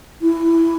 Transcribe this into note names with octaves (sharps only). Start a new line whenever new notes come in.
E4